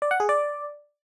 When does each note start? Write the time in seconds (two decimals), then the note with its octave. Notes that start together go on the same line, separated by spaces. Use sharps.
0.02 D5
0.11 F#5
0.20 G#4
0.29 D5